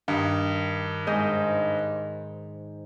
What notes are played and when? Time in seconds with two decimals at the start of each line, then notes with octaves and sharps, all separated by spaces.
0.08 G2 D#3
1.07 G#2 C5 D#5